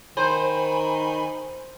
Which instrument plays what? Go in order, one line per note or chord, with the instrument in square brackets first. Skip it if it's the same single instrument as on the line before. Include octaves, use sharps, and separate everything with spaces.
[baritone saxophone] D#3 [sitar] C5 [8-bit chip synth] G#5 B5